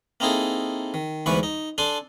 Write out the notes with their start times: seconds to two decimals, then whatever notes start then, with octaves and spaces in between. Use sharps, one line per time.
0.20 A#3 C4 D#4 E4 G#4 A4
0.94 D#3
1.26 D2 G#2 E3 B3 B4 C#6
1.43 D#4
1.78 D4 A4 G#5 A5 C6